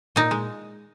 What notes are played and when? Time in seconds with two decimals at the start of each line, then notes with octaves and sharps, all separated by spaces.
0.16 A#2 D#4
0.31 G#3